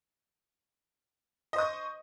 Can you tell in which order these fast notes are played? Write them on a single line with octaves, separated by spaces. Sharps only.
D#5 C5 D#6 C#6